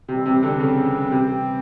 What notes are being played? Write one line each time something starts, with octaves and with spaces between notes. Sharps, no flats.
C3 E3 G3 C4
C3
D3
C#3
C3